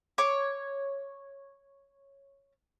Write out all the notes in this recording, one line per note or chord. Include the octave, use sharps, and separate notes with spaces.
C#5 D6